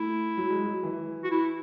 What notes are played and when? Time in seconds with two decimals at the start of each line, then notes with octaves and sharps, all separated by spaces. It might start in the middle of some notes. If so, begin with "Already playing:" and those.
Already playing: A3 E4
0.37 F#3
0.50 G#3
0.64 F#3
0.83 E3
1.24 F#4
1.31 E4